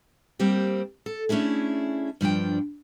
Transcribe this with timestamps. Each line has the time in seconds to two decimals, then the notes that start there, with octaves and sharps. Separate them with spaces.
0.39 G3 A#3 C4 G4
1.06 A4
1.29 A3 C#4 D4 E4 G#4
2.21 G2 F3 D4 G5